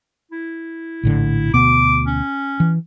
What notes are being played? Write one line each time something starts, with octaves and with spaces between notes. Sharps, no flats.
E4
A#1 A2 D3
D2 B2 B3 D6
C#4
E3